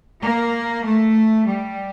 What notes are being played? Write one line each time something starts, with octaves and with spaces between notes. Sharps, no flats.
A#3
A3
G3